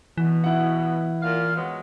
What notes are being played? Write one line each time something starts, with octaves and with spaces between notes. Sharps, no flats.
B2 E3
E4 F#5
A#2 F5
F#3 G#3 B3